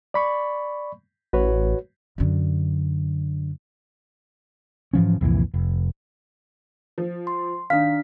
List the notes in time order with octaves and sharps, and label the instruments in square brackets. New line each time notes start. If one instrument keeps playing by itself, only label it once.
[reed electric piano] D5 B5 C#6
[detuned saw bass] A1 [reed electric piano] F#4 B4 C#5
[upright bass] F#2 D3
[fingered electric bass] G#2 E3 F3 C#4
C2 F2 A#2 E3
F1
[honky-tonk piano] F3
[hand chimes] C6
[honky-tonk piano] D#3 [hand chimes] D4 B6 [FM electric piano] F5